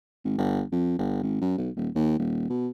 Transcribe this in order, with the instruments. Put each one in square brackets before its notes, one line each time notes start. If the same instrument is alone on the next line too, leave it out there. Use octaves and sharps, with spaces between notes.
[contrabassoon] G#1
G1
F2
G1
G#1
F#2
B1
D#1
D#2
D#1
B2